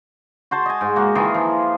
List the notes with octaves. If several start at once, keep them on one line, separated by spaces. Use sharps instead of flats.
F#4 C5 A5
D#5 G#5
G#2
A#3 F#4
D#3 E3 F4 G#4
F3